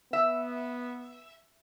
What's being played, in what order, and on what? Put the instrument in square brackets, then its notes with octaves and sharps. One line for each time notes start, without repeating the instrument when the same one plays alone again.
[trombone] B3 [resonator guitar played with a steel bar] E5